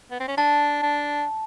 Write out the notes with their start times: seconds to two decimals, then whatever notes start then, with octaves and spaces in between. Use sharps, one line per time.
0.11 B3
0.20 C4
0.28 C#4
0.37 D4 A5
0.83 D4